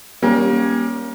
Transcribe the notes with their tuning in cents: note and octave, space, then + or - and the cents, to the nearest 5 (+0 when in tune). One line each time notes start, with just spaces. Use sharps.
G3 +0 A#3 +30 C#4 +0